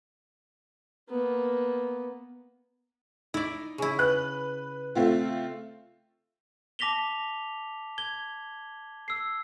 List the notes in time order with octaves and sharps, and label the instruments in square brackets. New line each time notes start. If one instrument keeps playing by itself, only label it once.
[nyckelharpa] A#3 B3
[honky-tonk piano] D#4 [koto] E4 D5
[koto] C#3 E4
[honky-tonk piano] B4 F#6
A3 C4 F4
[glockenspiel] A5 D6 A#6 B6 F7 G7
G#6 G7
E6 C7